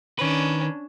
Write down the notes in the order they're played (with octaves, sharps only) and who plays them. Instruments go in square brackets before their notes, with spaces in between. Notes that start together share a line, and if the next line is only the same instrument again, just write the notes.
[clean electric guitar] D#3 B4 [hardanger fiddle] C#4 D4